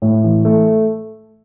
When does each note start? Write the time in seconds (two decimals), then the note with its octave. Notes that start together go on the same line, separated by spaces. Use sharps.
0.02 A2
0.23 E3
0.45 A3